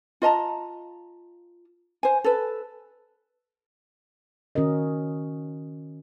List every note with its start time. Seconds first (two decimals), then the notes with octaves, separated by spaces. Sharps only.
0.22 F4 D#5 A5 A#5
2.03 C5 G#5
2.24 A4 B4
4.55 D#3 C#4 F#4 A#4 D#5